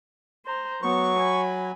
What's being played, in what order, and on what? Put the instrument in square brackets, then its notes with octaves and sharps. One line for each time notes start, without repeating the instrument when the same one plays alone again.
[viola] C5 A#5
[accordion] F#3 [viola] B3 [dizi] C#6
[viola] G#5 B5